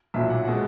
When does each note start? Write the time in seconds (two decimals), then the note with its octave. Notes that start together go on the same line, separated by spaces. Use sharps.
0.14 B1 A#2 F#3 E5
0.30 F#5
0.45 B2 G#3 F#5